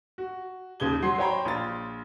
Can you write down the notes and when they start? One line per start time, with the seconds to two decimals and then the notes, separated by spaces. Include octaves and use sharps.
0.18 F#4
0.80 D#2 C#3 G#6 G7
1.02 F#3 F#5 C6 C7
1.18 C5 C#5 G5 A#5 B5
1.45 A#1 F4 A6